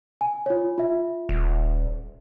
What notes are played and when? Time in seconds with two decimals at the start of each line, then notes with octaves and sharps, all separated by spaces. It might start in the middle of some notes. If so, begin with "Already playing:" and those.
0.21 G#5
0.46 F4 C#5
0.78 F4 E5
1.29 D#1